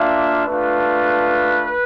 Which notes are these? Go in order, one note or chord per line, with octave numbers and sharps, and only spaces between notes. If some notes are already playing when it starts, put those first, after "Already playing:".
Already playing: A#3 D4 F4 E5
A3 D4 F4 B4